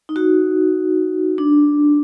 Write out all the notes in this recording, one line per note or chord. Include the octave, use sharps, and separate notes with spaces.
D#4
F#4
D4